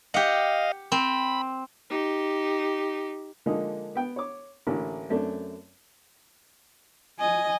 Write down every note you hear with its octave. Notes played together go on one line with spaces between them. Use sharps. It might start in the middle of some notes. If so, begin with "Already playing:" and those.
G4 D#5 F5 F#5
C4 B5
D#4 G4
D3 F3 G#3 A#3 D#4
B3 G5
C#5 D6
A1 D3 A#3 E4
F#2 A3 C4 D4
D#5 G#5